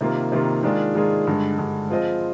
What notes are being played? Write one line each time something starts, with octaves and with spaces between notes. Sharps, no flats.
C3 D#3 A#3 F4
C3 D#3 A#3 F4
D#3 G#3 D4 F4 G#4
D#3 G#3 D4 F4 G#4
G2 D3 G#3
G2 D3 G#3
F3 C4 F4 G#4 D#5